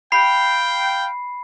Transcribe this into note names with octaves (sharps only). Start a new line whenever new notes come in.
F5 G5 B5 C7